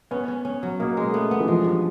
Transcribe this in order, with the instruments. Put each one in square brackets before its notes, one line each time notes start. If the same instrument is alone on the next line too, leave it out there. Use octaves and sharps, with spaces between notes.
[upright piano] B3 [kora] C#4
[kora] C#4
C#4
F#3
[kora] B2 [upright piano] A#3
[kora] G#3
[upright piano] A3 [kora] B3
[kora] B3
[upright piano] E3
[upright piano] F3 [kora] G#3
[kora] G2